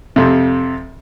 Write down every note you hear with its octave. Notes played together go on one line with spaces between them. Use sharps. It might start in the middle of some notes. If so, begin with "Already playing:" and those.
F2 C3